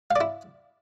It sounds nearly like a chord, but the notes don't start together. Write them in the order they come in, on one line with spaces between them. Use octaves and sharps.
F5 D5 E4